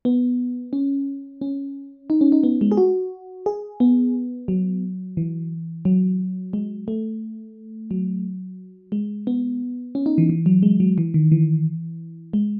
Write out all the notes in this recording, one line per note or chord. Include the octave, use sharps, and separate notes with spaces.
B3
C#4
C#4
D#4
C#4
D#4
B3
G#3
G#4
F#4
G#4
B3
F#3
E3
F#3
G#3
A3
F#3
G#3
B3
C#4
D#4
E3
E3
F#3
G#3
F#3
E3
D#3
E3
G#3